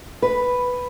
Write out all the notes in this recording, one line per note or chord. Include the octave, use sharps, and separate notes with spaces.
B4